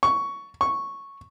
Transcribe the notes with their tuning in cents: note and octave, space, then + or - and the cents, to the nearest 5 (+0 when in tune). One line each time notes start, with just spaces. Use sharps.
C#6 +10
C#6 -5